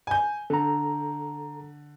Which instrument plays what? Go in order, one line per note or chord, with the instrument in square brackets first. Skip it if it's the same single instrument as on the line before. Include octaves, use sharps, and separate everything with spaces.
[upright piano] G#5 G6
[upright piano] D3 [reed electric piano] A4 A#5